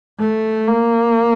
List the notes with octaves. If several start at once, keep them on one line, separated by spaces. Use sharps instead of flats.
A3
A#3